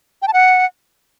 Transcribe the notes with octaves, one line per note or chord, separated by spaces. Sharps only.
G5
A5
F#5